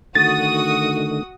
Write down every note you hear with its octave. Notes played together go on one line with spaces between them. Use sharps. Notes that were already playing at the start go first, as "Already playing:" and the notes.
D3 D#3 A3 F#4 D#6 A6